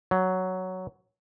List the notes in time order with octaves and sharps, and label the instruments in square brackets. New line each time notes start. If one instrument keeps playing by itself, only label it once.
[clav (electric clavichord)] F#3